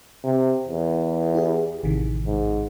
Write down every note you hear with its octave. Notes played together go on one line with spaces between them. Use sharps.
C3
E2
E4 G4 G#4
A1 C3 D#3
G#2